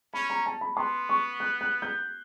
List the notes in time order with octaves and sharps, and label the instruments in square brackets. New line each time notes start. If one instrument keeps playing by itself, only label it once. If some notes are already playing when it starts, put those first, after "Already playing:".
[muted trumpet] C#4 [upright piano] B5
[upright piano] A#5
A5
B5
[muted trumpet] B3 [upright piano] C6
[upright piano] C#6
F#6
F#6
G6